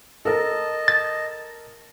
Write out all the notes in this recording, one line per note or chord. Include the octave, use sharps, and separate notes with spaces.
A4 A#4 D#5 A5
A6